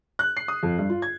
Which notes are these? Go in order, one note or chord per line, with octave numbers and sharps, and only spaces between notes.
F#6
C7
D#6
F2
G2
F4
G#6